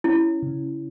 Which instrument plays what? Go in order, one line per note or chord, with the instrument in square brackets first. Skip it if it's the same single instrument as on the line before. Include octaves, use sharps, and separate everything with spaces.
[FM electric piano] C#4 [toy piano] E4
[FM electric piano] C#3